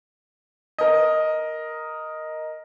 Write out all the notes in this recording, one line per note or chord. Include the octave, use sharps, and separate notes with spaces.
A#4 D#5